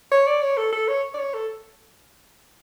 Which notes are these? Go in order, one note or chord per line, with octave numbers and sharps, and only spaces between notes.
C#5
D5
C#5
A4
A4
C#5
D5
C#5
A4